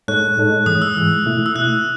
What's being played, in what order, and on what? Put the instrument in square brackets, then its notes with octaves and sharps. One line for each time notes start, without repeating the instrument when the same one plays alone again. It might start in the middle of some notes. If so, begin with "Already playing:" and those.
[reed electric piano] A2 G#3 D#4 A4 C#5 [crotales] F#6
[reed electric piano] A2 G#3 D#4 A4 C#5
[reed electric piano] G#2 E3 G#3 [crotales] D#6
[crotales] E6
[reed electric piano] G#2 E3 G#3
B2 A3 E4
[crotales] E6
[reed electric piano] B2 A3 E4 [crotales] F#6